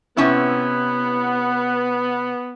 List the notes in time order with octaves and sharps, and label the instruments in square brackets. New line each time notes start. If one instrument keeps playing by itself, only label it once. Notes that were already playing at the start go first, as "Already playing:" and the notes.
[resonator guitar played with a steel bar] C3 C#4 E4 [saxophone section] B3